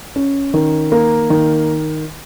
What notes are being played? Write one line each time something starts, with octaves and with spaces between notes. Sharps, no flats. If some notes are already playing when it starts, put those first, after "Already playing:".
C#4
D#3
A#3
D#3